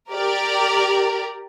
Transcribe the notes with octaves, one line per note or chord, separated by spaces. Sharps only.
G4 A#4 D5